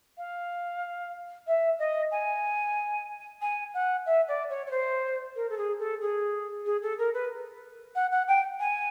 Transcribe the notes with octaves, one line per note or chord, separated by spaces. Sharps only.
F5
E5
D#5
G#5
G#5
F#5
E5
D5
C#5
C#5
C5
A#4
A4
G#4
A4
G#4
G#4
A4
A#4
B4
F#5
F#5
G5
G#5